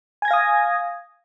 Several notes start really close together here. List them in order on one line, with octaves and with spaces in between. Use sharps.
G#5 G#6 A#6 F5 D#6